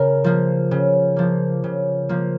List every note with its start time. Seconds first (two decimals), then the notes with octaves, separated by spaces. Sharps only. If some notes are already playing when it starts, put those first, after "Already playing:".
Already playing: C#3 A#4
0.24 F3 A#3
0.71 C#3
1.16 F3 A#3
1.64 C#3
2.09 F3 A#3